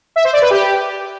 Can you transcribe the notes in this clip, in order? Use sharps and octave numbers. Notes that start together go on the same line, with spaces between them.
E5
C5
D5
B4
G4